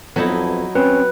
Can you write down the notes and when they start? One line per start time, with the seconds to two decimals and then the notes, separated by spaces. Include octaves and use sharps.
0.16 F2 F#3 B3 D#4 E4 A4 A5
0.75 C4 C#4 B4